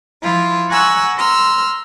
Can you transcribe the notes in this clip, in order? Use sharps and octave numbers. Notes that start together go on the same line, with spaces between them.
F3 E4 F4
F#5 G#5 A#5 C#6 E6 F#6
A#5 C6 E6 F6